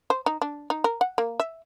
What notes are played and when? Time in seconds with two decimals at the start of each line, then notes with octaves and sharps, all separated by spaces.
0.10 C5
0.26 D#4
0.42 D4
0.70 D#4
0.84 A#4
1.01 F#5
1.18 A#3
1.40 E5